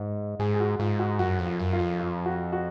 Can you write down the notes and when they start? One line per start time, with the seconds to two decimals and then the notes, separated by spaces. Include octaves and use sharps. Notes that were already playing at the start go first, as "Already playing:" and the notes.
Already playing: G#2
0.39 G#2 G#4
0.54 G#4
0.60 F#4
0.80 G#2 F4
0.99 F#4
1.19 F#2 F#4
1.39 F2
1.46 F4
1.60 F#2
1.73 F4
1.79 F2
1.99 F4
2.26 F#4
2.53 F#4